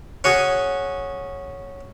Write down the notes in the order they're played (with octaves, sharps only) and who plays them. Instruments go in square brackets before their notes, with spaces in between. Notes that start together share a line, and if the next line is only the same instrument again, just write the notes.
[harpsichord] C#4 F#4 G#4